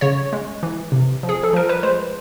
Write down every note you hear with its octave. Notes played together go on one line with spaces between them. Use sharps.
C#3 C#5
G#3
E3
C3
F3
G#4
A4
F3 A#4
B4
G#3 C5